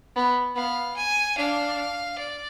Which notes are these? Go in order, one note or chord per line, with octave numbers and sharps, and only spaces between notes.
B3
B3 F5
G#5
D4 F5
D5